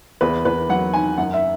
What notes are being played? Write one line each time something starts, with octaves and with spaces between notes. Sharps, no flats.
E2 B4
E2 B4
F#3 F#5
D#3 G#5
F#2 F#5
E5